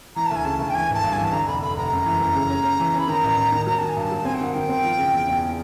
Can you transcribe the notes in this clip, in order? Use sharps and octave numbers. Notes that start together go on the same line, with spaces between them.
E3 A#5
A5
D2
G#5
C#3 A5
D2
G5
E3 G#5
G#1 A5
G2
G#5
E3
A5
D3 A#5
F1 B5
F1 B5
F1 A#5
F#2
E3
F#2
C#3
C#4
C#4
E3
C#4 B5
D#3 A#5
A1
A1
D#3
F#3 A#5
D#3 A5
G#5
G2 A5
F#3
C4 G#5
G5
D#3 F#5
D#3 G5
C4
F3
C#3
E2
E2